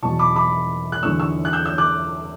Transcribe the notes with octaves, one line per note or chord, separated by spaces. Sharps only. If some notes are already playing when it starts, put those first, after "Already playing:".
E2 B2 F#3 A5 C#6
B5 D6
B5 D6
F#6
E2 D3 F#3 C#6 E6
C#6 E6
F#6
E6 G6
E6 G6
D6 F#6